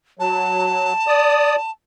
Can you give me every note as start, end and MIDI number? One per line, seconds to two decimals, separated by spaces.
0.19 0.93 54
0.19 1.70 81
1.07 1.56 74
1.07 1.56 87